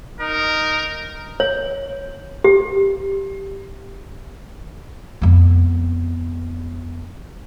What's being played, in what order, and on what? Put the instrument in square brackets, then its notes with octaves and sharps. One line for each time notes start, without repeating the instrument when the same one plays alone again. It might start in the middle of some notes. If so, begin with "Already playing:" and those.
[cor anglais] D#4 [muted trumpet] A#4
[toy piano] C#5
G4
[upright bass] F2 B3